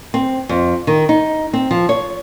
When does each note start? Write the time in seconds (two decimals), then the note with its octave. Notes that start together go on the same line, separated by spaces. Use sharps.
0.14 C4
0.49 F2
0.87 D#3
1.09 D#4
1.53 C4
1.71 F3
1.89 C#5